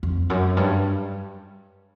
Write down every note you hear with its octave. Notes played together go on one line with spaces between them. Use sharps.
F2
F#2
G2